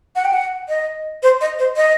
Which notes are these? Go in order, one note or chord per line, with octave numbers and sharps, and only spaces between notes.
F#5
G5
F#5
D#5
C5
D#5
C5
D#5